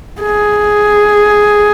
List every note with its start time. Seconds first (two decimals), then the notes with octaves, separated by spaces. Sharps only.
0.21 G#4